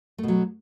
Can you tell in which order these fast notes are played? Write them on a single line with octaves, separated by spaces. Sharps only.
A3 B2 F#3